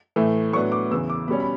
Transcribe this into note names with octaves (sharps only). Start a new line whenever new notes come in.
A2 E3 A3
A2 F#3 B3 D4 C#6
D6
E2 C#3 E3 E6
D6
B2 G3 C#4 B5
B5